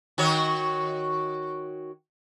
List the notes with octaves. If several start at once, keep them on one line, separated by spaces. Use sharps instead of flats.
D#3 F#4 C#5